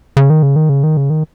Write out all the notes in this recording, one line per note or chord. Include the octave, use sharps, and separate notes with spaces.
C#3
D#3
C#3
D#3
C#3
D#3
C#3
D#3